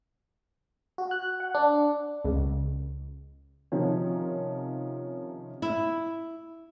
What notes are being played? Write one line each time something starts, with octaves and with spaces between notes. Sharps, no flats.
F#4
F#6
F#5
D4
C#2
C3 D#3 F3 C#4 D#4
E4